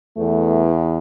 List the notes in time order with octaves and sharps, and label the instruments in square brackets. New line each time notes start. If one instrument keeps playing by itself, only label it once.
[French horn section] E2 E3 A3